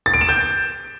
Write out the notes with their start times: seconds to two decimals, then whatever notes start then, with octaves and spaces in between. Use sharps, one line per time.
0.06 A6
0.14 D7
0.21 E7
0.29 G6